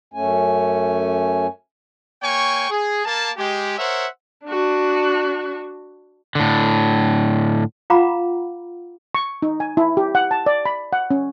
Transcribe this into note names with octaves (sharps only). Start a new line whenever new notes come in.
F#2 A3 C#4 G#5
A#3 C#5 G5 G#5 C#6
G#4
A#3 A5
G#3 G4
A#4 C5 C#5 E5 F#5
D4 F#4
A2 D3
F4 F5 F#5 A#5 B5 D6
C#6
D#4
G#5
E4
G4
F#5
A5
D5
B5
F#5
C#4